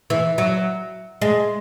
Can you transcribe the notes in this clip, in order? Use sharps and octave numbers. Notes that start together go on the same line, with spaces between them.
E3
F#3
G#3